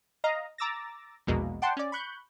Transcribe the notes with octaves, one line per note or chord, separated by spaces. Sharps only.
D#5 F5 A#5
A#5 D6 E6 A6 A#6
A#1 E2 B2 G#3 A#3
D5 F#5 G5 A5 C6
C#4 D5
B5 C#6 F#6 G6